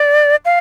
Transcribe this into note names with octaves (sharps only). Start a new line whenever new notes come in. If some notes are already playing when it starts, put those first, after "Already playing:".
Already playing: D5
F5